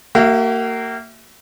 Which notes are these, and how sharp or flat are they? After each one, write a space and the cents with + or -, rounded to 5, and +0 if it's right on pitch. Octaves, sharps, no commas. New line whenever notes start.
A#3 -25 F#4 +40 E5 +0